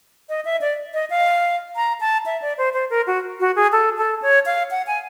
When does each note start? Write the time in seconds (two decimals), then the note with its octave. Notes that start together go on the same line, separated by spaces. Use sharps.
0.29 D#5
0.45 E5
0.61 D5
0.94 D#5
1.10 F5
1.76 A#5
2.00 A5
2.26 E5
2.42 D5
2.58 C5
2.74 C5
2.90 A#4
3.07 F#4
3.40 F#4
3.56 G#4
3.72 A4
3.98 A4
4.22 C#5
4.46 F5
4.71 F#5
4.87 G#5